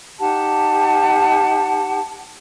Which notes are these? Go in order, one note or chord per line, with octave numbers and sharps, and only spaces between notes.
D#4 G4 F#5 A5